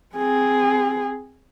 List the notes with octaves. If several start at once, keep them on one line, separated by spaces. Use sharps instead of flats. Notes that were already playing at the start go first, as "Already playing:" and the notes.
C4 G#4